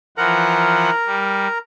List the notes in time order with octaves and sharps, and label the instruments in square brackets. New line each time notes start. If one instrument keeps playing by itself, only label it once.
[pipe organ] E3 F3 F#5 [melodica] A#4 A#5
[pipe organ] G3